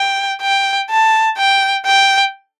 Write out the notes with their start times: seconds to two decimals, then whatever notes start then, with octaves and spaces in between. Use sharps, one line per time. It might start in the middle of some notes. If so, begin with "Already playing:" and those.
Already playing: G5
0.42 G5
0.90 A5
1.38 G5
1.86 G5